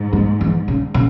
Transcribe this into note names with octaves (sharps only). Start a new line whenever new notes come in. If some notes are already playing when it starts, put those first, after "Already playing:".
Already playing: G#2
G#3
E3
G2 C#3
C#3